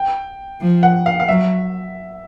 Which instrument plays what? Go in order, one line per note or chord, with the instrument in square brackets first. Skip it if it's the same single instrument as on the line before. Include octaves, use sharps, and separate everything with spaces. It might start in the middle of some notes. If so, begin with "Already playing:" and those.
Already playing: [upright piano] G5
[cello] F3
[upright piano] F#5
F5
F5
[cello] F#3 [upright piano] E5